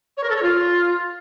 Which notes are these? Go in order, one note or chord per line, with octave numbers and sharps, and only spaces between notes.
C#5
A#4
A4
C#5
F4